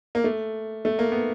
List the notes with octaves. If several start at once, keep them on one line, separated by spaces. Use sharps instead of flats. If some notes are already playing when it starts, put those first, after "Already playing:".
A#3
A3
A3
A#3
B3